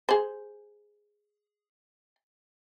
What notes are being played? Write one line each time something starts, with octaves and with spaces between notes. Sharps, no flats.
G#4 C5